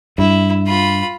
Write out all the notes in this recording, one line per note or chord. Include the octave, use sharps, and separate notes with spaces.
G2 E4
F4 B5